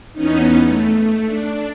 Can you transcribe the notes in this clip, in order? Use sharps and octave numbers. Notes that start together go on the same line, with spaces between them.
E2 B3 C#4 D#4
A3
D4